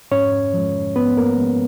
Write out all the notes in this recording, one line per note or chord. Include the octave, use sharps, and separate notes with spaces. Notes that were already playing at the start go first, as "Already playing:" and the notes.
G#2 C#4 C#5
F3 G#3
G#2 B3 B4
A#3 A#4
F3 G#3